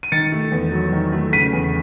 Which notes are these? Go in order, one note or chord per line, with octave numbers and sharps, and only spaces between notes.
D#7
D#3 A6 C#7
A3
E2
F#3
D#3
A3
C#3 B6 D#7
E2